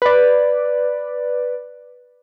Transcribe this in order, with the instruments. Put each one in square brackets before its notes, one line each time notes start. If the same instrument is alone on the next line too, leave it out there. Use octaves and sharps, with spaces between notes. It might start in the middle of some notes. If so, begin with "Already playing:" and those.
[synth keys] B4 D5